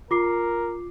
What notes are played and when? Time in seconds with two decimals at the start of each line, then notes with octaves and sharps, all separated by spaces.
0.11 F4 A#4 D6 C7